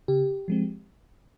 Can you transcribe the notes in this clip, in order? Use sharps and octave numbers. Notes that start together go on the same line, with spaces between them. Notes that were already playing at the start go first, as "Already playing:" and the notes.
C#3 G4
F3 G#3 C4